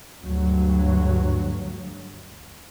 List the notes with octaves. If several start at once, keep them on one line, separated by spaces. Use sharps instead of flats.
D2 G2 F#3